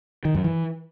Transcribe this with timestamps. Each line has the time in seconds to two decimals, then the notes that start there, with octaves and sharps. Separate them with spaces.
0.25 D#3
0.35 F#2
0.44 E3